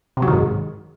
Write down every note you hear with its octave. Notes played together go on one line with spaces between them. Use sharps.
C3
F#3
D#3
G#2